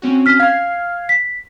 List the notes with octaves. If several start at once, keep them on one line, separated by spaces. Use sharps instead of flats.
C4 C#4 F#4
F6 B6
F5 F6 G#6 C7
B6